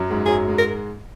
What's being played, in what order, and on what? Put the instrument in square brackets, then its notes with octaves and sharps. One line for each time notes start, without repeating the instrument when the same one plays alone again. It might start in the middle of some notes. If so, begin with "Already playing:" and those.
Already playing: [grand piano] F#2 F#3
G#2 G#3
[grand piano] F#2 F#3 [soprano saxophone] G#4
[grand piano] G#2 G#3
[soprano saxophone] A#4